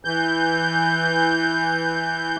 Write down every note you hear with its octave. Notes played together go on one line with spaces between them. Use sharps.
E3 G6